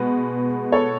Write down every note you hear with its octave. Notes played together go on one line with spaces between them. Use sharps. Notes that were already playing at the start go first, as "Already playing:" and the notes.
Already playing: B2 G#3 B3 B4
A4 C#5